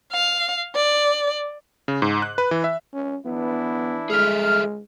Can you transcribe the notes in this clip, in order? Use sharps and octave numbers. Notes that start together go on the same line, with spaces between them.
F5
D5
C#3
G#2
F#6
B4
E3
E5
C#4
E3 B3 D4 E4
G#3 G#4 A4 E5 F6